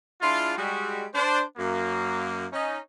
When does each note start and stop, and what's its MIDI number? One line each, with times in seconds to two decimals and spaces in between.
0.20 0.52 56
0.20 0.52 62
0.20 0.52 64
0.20 0.52 65
0.56 1.05 55
0.56 1.05 56
0.56 1.05 66
1.14 1.41 62
1.14 1.41 72
1.57 2.45 42
1.57 2.45 58
2.52 2.77 61
2.52 2.77 63